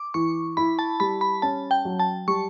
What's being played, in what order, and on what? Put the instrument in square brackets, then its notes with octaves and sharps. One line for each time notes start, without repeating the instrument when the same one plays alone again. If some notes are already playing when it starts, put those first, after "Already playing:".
Already playing: [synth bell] D6
[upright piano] E3 [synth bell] C#6
[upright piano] E4 [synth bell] B5
[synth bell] A5
[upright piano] G3 [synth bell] B5
[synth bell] B5
[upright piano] C#4 [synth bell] A5
[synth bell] G5
[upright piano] F#3
[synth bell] A5
[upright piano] G3 [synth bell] C#6